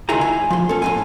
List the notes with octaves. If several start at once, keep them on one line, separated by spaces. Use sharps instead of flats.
C#2 D#3 E4 G#4 G#5 A#5
G#5
F3 C6
C#4 A4
A2 C4 G#5